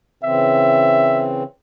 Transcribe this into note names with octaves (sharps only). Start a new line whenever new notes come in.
C#3 E3 C4 E5